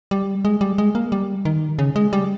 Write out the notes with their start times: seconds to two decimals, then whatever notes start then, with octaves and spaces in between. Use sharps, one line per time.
0.11 G3
0.45 G#3
0.61 G3
0.78 G#3
0.95 A#3
1.12 G3
1.45 D#3
1.79 C#3
1.96 G#3
2.13 G3